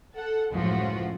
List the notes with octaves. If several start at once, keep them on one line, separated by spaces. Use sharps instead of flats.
A4 F#5
C#2 F#2 A2 F3 F4 F#4